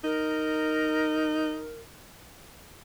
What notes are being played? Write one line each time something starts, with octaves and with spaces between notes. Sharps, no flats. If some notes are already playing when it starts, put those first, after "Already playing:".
D#4 A#4